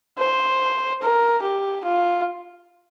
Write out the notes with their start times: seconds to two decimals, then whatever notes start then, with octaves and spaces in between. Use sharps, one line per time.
0.18 C5
1.02 A#4
1.42 G4
1.85 F4